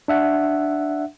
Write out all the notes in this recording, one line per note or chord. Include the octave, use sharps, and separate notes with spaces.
D4 E5 F#5